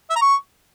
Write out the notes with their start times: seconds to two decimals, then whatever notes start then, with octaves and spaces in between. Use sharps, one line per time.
0.10 E5
0.16 A#5
0.22 C#6